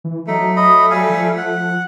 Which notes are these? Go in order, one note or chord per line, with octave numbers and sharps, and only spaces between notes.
E3
F#3 A3 D#4
D#5 B5
G3 F5 G#5
F3
F#5